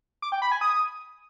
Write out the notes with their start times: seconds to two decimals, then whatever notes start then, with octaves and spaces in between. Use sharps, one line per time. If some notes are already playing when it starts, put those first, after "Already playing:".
0.22 D6
0.32 G5
0.42 B5
0.52 G#5
0.61 D#6